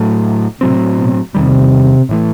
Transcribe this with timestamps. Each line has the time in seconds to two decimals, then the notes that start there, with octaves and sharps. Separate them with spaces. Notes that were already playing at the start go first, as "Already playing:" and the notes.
Already playing: A2 F#3 A3
0.61 A2 C3 F#3 C4
0.98 B2
1.35 E2 C3 D#3 G3
2.09 A2 E3 A3